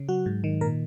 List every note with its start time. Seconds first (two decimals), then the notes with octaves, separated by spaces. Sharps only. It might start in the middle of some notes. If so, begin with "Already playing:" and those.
Already playing: C#3
0.09 F#3 F#4
0.26 G#2
0.44 D#3
0.61 A#2 A#4